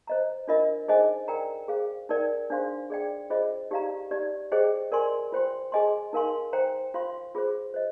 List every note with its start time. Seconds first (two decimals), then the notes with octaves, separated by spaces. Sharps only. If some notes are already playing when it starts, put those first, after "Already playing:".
0.07 C5 D#5 A#5
0.48 D4 F4 A#4 D#5
0.88 D#4 G#4 C5 D#5 G#5
1.28 A#4 D5 G5 A#5
1.68 G#4 C5 F5
2.09 D#4 A#4 D5 G5
2.50 D4 G#4 C5 F5 C6
2.90 G#4 D5 G5
3.30 F4 G#4 C5 D#5
3.71 D#4 G4 D5 F5 A#5
4.11 D#4 G4 D5
4.52 G#4 C5 D#5 G5
4.92 A#4 D5 G#5 C6
5.32 F4 C5 G5 C6
5.72 G#4 D#5 G#5 C6
6.13 D#4 A#4 F5 G#5 C6
6.53 C5 G5 A#5
6.94 F4 C5 F5 C6
7.35 F4 G#4 C5
7.74 C5 D#5